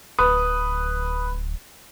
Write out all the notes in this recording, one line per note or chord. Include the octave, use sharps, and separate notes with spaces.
D1 B4 D#6